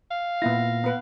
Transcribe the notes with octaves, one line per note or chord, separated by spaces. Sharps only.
F5
A#2 A#3 B3 E4 A#6
B3 B4